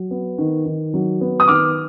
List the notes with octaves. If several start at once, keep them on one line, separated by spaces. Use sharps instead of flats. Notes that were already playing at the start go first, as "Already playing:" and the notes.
Already playing: F#3
B3
D#3
D#3
F#3
B3
D#6
D#3 D6 F6